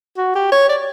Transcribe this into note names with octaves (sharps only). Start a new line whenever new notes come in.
F#4
G4
C#5
D5